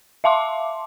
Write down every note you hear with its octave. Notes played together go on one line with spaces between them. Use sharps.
E5 F5 A5 C6 D6